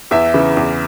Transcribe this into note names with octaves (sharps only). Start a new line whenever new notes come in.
E2 E5
C#3 E3
E2